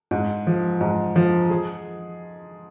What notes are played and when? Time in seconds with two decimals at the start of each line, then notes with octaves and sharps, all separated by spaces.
0.11 G#2
0.47 F3
0.81 G#2
1.16 F3
1.50 G#4